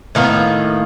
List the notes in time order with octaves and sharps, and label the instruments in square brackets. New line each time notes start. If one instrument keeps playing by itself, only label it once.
[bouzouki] A2 D#3 A#3 B3